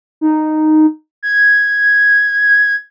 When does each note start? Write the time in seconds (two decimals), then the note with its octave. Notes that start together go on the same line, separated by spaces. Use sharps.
0.21 D#4
1.23 G#6